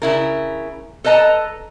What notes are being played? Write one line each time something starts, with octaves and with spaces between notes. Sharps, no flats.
C#3 E4 A#4
A4 B4 D#5 A5 A#5